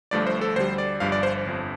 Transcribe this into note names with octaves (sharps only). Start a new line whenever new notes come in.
G1 G2 F3 A3 D5
C5
A4
D2 D3 G3 C5
D5
G1 G2 F3 F5
D5
C5
G1 F2 F3